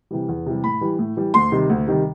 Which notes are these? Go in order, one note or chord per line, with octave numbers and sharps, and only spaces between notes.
C3 E3 G3
E2
C3 E3 G3
A2 B5
E3 G3
A2
E3 G3
D2 C6
C3 D#3 G3
D2
C3 D#3 G3